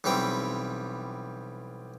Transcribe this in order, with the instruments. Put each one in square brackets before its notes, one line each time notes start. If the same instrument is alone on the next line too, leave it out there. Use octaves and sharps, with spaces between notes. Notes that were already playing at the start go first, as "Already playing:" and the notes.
[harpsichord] B1 E3 G3 C4 G5